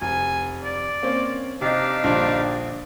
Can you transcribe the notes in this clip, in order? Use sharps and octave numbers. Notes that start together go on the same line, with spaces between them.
F1 G#5
D5
A#3 C4 C#4
C3 D4 D#4 G4 D#5 F5
A#1 G2 D3